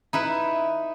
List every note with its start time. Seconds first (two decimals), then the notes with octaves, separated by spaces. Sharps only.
0.13 D#4 E4 B4